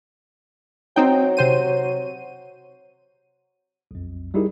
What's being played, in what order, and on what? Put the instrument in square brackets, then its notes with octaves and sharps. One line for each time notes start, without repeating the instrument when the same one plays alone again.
[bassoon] F#3 [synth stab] C4 D#4 G5
[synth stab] C3 C5 D#7
[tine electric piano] B1 F2
G3 D#4 E4 G4 G#4 A#4